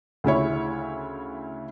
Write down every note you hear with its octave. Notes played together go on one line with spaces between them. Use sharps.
D2 C#3 E4 C#5